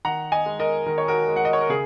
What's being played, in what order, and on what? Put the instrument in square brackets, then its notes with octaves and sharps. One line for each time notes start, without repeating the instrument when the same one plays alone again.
[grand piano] D#3 F#5 A#5
D#5 G#5
G#3
A#4 D#5
D#3 A#4
C#5
F#4 A#4
G#3
F#5
D#5
C#5
A#4
C#3 G#4